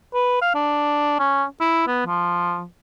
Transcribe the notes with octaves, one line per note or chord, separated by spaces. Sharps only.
B4
F5
D4
C#4
E4
B3
F3